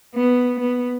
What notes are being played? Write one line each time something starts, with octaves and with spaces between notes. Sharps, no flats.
B3
B3